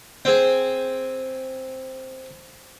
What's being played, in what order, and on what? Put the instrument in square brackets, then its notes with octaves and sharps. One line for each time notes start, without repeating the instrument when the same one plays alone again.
[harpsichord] C4 G#4